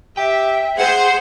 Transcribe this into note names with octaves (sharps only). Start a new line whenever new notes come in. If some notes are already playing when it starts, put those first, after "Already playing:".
G4 E5 G5
G#4 C5 F#5